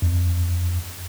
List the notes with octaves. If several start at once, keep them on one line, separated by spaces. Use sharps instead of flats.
F2